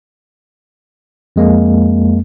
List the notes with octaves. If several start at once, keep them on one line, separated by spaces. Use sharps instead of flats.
F2 G#3 A#3